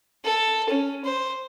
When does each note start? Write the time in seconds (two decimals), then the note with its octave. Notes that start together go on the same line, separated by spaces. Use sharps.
0.24 A4
0.70 C#4
1.04 C5